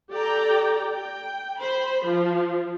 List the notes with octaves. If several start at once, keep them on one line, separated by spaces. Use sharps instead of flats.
G4 A4 D5 G5 A#5
G5
C5 B5
F3